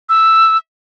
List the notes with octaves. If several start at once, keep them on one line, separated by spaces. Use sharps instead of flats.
E6